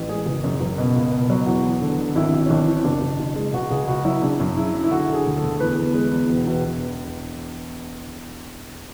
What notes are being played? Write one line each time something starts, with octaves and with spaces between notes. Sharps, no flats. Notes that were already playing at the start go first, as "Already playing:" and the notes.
Already playing: A1
G#3 G#4
F#1
F#2
F#1
B2
C#2
B2
F#3
E2 F#4
E2
D3
D3
G#1 E4
G#1
C#4
G#1 D4
E3
F#1 D4
F#1
F#1
G#3
C#2 F#4
C#2 G#4
C#2 F#4
F#3 E4
C#3 D4
F#2
C#3 E4
F#3
E4
D3 F#4
D3 G#4
D2
A4
D2
E2 B4
E2
G#3
E2
E1
E1
E1